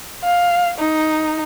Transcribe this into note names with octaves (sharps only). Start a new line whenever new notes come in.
F5
D#4